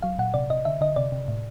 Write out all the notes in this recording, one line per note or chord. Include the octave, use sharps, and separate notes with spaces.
F#3 F5
A#2 F#5
C3 D5
C3 D#5
D3 E5
D3 D#5
C3 D5
C3
A2